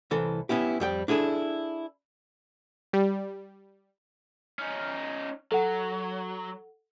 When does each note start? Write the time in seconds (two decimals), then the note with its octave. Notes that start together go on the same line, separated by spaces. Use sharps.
0.11 C2 E3 A4
0.49 B3 C#4 E4 G4
0.80 F2 G3 G5
1.08 D4 E4 G#4 A4
2.93 G3
4.59 C#4 D#4
5.52 F#3 A4 F#5